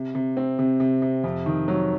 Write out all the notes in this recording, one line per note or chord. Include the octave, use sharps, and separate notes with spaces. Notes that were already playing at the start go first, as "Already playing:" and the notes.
Already playing: C3
C3
C4
C3
C3
C3
F2
D#3
F#3